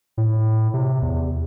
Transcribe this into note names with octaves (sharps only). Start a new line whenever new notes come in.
A2
C3
E2